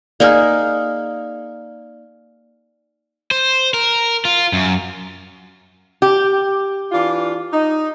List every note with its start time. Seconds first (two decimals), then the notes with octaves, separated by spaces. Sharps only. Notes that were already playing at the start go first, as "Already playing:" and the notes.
0.20 A#3 D#4 G#4 D5 F6
3.31 C5
3.74 A#4
4.25 F4
4.53 F#2
6.02 G4
6.92 E3 D4 F4
7.52 D#4